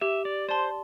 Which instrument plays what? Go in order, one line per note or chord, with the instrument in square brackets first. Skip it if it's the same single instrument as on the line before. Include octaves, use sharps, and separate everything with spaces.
[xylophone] G4 [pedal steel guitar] E5
[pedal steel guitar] D5
[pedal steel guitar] C5 [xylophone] D5 A5 C6